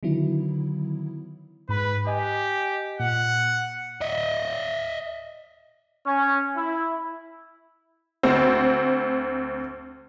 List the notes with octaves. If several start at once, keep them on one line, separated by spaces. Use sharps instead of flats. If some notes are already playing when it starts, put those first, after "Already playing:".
D3 D#3 F#3 B3 E4
G#2 B4 B5
G4 D#5 G#5
A#2 F#5
D#5 E5
C#4
E4
D2 C4